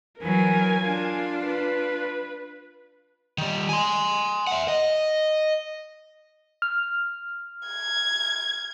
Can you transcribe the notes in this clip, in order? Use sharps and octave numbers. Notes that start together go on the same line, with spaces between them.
E3 F#3 A#4 G#5
D4 F4
B4
D#3 G3
G#5 C6
E5 F#5
D#5
F6
G#6